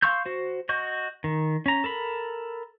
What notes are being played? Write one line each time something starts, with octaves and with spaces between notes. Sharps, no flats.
F5 C6 C#6 E6 G6
F#4 C5
F#4 D#5 C#6 G6
D#3
C#4 A#5
A4 A#4 B5